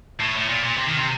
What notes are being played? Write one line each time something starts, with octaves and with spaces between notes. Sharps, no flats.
A2
A2
A#2
A#2
C3
D#3
C3